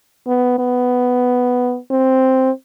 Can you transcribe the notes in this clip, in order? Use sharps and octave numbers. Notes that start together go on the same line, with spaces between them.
B3
B3
C4